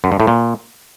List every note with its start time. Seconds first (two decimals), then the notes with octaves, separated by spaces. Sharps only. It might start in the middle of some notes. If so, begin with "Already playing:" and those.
0.04 F#2
0.12 G2
0.20 A2
0.27 A#2